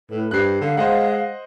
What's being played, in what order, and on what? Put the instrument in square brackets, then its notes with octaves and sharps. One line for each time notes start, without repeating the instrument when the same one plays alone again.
[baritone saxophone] A2 [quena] B4
[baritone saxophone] G2 [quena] C5 [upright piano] F#6 C7
[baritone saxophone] D3 [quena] F5
[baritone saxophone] G#3 [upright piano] C5 D#5 F#5